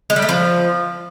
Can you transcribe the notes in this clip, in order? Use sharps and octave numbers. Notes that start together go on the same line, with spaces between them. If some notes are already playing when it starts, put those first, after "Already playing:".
G#3
G3
A3
F3